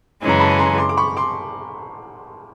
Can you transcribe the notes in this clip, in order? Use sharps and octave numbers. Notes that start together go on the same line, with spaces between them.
F#2 C#3 E3 G#3 C#4
A#5
A5 B5
A#5 C6
C6 D6
D6
B5 C#6
C6 D6